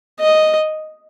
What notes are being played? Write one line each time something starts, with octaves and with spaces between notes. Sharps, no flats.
D#5